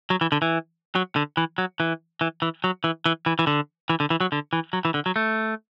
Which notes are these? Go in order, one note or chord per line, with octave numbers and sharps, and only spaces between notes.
F#3
E3
D3
E3
F#3
D3
E3
F#3
E3
E3
E3
F#3
E3
E3
E3
E3
D3
E3
D3
E3
F#3
D3
E3
F#3
E3
D3
F#3
A3